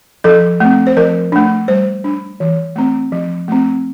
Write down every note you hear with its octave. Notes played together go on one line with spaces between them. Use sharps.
F3 A4
A3 C4
C5
F3 A#4
A3 D4
G3 C5
D4
E3
A3 C4
F3
A3 C4